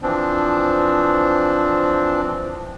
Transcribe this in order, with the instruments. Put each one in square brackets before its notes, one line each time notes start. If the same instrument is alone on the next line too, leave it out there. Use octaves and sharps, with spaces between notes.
[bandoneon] E3 F3 C4 D4